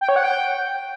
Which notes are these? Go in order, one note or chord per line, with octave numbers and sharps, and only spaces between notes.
G5
C#5
F#5
G5